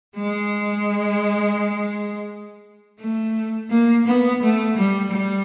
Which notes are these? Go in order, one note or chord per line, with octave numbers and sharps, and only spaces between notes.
G#3
A3
A#3
B3
A3
G3
G3